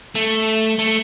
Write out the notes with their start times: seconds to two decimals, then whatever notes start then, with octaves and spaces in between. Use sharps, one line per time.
0.15 A3
0.79 A3